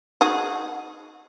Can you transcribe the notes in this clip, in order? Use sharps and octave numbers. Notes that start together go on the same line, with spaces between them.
D#4 F#4 G#4